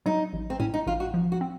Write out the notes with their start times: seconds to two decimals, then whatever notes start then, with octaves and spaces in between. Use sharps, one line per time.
0.06 F#3 D#4
0.33 A1
0.50 C4
0.60 A2 C#4
0.74 D#4
0.87 A1 F4
1.00 F#4
1.14 F3
1.32 F#4
1.41 C4